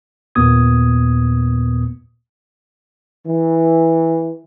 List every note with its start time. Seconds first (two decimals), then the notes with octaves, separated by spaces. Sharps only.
0.35 D#2 A#2 A#3 B3 D#6 G#6
3.24 E3